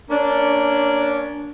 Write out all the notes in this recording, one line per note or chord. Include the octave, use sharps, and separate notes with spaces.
A#3 C#4 D4